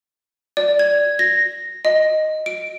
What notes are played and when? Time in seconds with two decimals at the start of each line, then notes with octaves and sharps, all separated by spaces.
0.57 D5
0.79 G#6
1.19 A#6
1.85 D#5
2.46 D7